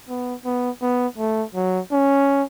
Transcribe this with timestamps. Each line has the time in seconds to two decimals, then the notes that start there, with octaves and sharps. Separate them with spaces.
0.09 B3
0.45 B3
0.82 B3
1.18 A3
1.54 F#3
1.92 C#4